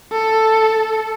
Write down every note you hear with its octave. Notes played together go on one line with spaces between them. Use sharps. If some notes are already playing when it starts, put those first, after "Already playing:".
A4